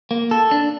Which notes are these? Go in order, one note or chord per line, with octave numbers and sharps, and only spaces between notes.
A#3
A4
D4